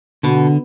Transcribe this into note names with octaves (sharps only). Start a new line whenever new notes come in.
B2 D3